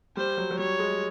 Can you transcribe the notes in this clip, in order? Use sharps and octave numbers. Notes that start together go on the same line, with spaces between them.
G3 C5
F#3
F#3
G3 C#5
G#3